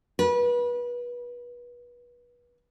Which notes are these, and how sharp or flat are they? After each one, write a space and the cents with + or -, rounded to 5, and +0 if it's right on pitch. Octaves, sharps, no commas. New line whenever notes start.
B4 -30